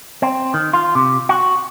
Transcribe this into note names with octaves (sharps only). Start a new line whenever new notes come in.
C4
D#3
F4
C3
F#4